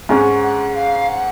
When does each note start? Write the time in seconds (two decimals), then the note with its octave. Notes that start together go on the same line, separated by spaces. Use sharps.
0.09 G#2 G#3 C#4 F#5
0.43 F#5
0.76 F5
1.09 F#5